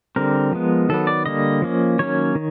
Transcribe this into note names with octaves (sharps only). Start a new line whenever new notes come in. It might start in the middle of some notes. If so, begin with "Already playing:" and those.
D3 G3 C4 A#4
F3 G#3 B3
D#3 F#3 B3 A4
D5
D3 G3 A#3 D#5
F3 A#3 C#4
D#3 F#3 A#3 C#4 C#5
D#3